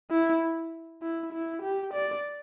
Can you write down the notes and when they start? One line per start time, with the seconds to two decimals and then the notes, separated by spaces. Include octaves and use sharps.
0.11 E4
1.03 E4
1.33 E4
1.62 G4
1.94 D5